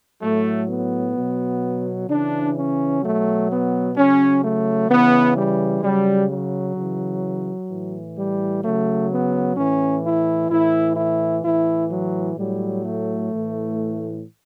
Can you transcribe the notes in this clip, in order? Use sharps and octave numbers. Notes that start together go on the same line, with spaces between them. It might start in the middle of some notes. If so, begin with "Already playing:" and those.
A2 F#3 A3
B3
B2 F#3
C#3 E3 D4
C#4
B2 F#3 A3
B3
C#3 F#3 C#4
A3
C#3 E3 B3
G3
C#3 F#3 G3
F#3
C#3 E3
A2 E3
G3
C#3 F#3 A3
B3
A2 E3 C#4
E4
A2 E3 E4
E4
A2 E3 E4
F#3
A2 F#3 G3
A3
A2 E3